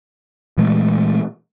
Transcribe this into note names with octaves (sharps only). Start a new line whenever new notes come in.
A#2 E3 G#3 A3